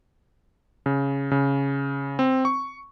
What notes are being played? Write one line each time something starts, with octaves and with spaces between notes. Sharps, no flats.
C#3
C#3
C4
C#6